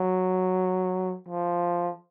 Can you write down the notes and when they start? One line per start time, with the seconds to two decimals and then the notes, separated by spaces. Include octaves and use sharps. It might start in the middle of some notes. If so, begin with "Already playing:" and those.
Already playing: F#3
1.29 F3